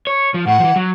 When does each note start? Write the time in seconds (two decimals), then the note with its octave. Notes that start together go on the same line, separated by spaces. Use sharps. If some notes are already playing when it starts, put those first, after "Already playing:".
0.07 C#5
0.34 F3
0.47 A2 F#5
0.60 E3 F3
0.76 F#3